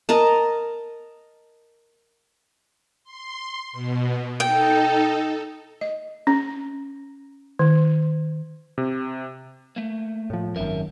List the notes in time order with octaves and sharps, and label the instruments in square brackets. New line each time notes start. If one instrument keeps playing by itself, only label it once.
[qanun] A#4 D#5 A5
[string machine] C6
B2
[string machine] D#4 A4 [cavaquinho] G5
[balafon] D#5
C#4
D#3
[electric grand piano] C3
[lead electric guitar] A3 A#3
[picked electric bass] A2 F3
[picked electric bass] G#1 F#2 [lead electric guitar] A#4 E5